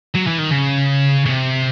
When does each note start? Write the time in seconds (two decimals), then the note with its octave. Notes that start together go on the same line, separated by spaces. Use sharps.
0.15 F#3
0.27 E3
0.38 D#3
0.50 C#3
1.26 C#3
1.29 C3